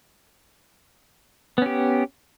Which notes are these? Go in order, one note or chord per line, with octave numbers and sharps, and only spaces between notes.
B3 C#4 G4